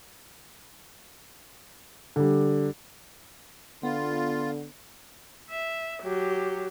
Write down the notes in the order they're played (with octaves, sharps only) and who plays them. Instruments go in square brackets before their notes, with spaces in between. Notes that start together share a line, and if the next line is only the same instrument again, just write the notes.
[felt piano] D3 G3
[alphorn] D3 [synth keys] B3 [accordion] F4
[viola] E5
F#3 G4